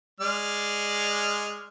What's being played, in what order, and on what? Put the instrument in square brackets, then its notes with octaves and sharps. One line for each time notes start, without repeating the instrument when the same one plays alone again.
[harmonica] G#3 D5 F6